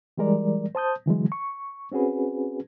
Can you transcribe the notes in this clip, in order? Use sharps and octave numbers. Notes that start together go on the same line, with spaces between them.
E3 G3 G#3 A#4 D5
C5 A5 D#6 G6
D3 E3 F#3 G#3
C#6
C4 C#4 F#4 G#4 B4